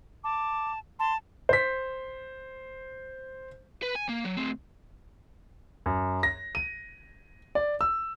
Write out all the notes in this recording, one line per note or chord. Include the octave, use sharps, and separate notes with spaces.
A5 D6
A5 C6
C5 B6
B4
G#5
A#3
F#3
A2 C4
F#2
A#6
D#7
D5
E6